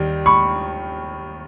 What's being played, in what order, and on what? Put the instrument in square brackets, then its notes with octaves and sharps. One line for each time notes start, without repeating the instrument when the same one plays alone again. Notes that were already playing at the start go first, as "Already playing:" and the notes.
Already playing: [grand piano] D#2 D#3 G3
B5 C#6